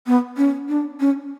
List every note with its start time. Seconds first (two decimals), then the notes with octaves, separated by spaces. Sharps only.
0.07 B3
0.37 C#4
0.68 D4
1.00 C#4